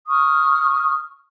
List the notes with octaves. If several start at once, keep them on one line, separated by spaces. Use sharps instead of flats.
C#6 D#6 F6